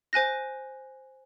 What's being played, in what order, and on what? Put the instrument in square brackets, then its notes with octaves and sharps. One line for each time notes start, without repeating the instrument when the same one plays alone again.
[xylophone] C5 G#5 F#6 A#6